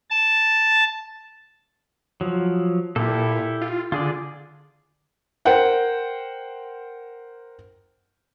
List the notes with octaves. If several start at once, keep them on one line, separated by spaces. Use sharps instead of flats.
A5
F3 F#3
A#2 E4 G4 A4
F4
D3 F4 G#4 D5
A#4 C5 F#5 G5